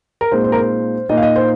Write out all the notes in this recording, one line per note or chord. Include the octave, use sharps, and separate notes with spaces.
A#4
A#2 G#3 C4 D#4 C5
C5
A#4
C5
A#2 A#3 D#4 D#5
F5
D#5
C5